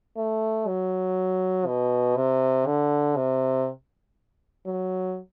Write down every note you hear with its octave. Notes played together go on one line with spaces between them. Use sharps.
A3
F#3
B2
C3
D3
C3
F#3